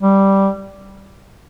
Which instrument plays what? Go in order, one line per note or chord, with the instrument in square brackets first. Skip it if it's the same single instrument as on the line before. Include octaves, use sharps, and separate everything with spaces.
[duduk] G3